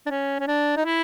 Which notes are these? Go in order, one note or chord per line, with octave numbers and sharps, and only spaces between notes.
D4
C#4
C#4
D4
D#4
E4